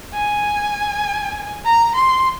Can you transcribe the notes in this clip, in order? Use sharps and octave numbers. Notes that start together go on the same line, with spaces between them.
G#5
A#5
C6